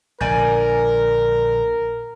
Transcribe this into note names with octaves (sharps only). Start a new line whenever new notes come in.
A#1 D3 A#4 D5 G#5 G6